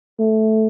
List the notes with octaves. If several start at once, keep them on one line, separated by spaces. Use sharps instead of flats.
A3